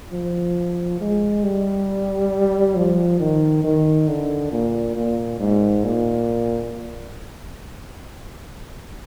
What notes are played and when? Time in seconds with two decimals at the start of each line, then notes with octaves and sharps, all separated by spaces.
0.12 F3
1.01 G#3
1.43 G3
2.76 F3
3.20 D#3
3.64 D#3
4.08 D3
4.52 A#2
4.96 A#2
5.40 G#2
5.84 A#2